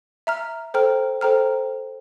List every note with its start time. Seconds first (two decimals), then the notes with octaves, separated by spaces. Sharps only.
0.27 E5 A#5 F6
0.74 A4 C5 G5 A#5 F6
1.21 A4 C5 G5 A#5 F6